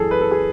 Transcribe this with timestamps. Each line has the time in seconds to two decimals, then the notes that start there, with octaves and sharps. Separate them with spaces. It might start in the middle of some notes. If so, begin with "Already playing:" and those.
Already playing: F#2 E3 G#4 A4
0.11 B4
0.21 A4
0.31 G#4